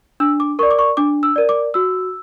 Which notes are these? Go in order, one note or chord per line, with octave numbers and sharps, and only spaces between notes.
D4 E6
D6
A#4 D5 C#6
D6
C#6
D4 D6
E6
A#4 D5
D6
F#4 E6